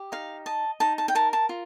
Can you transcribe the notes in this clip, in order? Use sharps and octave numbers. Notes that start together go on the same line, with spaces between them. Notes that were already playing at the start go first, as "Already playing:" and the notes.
Already playing: G4
D#4 F5
D#5 A5
D#4 A5
A5
G5
A#4 A5
A5
F4